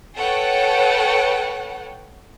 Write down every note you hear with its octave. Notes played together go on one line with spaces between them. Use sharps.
A4 B4 C#5 F#5 G5